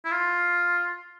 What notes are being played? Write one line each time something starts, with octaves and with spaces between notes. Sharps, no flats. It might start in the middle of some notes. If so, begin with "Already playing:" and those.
E4
F4